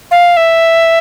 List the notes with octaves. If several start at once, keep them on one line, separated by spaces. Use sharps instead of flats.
F5
E5